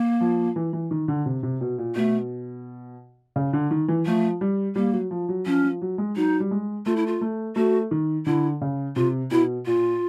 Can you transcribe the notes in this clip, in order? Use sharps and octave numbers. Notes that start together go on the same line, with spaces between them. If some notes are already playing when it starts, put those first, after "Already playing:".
Already playing: A#3
F3
E3
E3
D#3
D3
C3
C3
B2
A#2
B2 A3
C#3
D3
D#3
E3
F3 A3
G3
G3 A#3
F#3
F3
F#3
F3 C#4
F3
F#3
G#3
F#3 D#4
G3
G#3
A3 F4
E4
F4
A3
A3 F#4
D#3
D3 E4
C#3
C3 F4
B2 E4
A#2 F4